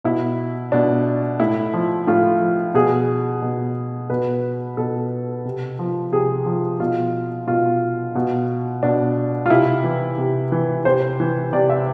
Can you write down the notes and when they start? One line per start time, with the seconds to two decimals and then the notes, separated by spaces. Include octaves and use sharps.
0.04 B2 E4
0.72 B2 D4
1.40 A2 E4
1.73 F3
2.07 A2 F4
2.41 F3
2.74 B2 G#4
3.42 B2
4.10 B2 B4
4.77 B2 A4
5.45 C3
5.79 F3
6.12 C3 G#4
6.46 F3
6.80 B2 F4
7.47 B2 F4
8.15 B2
8.83 B2 D4
9.46 F4
9.50 C3 E4
9.84 E3
10.18 C3
10.52 E3
10.85 C3 C5
11.20 E3
11.53 C3 D5
11.70 E5